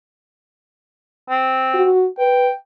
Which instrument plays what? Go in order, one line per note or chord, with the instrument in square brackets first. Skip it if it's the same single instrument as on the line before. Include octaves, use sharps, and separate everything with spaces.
[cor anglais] C4
[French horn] F#4
[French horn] B4 [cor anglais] G5